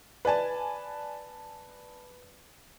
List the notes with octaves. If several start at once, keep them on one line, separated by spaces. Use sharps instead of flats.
B4 D5 G#5 A5